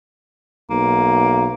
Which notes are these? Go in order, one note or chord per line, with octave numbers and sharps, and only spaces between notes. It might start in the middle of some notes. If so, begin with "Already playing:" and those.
B1 A#3